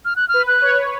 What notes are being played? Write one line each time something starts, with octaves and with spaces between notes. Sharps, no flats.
F6
F#6
F6
B4
F#6
C#5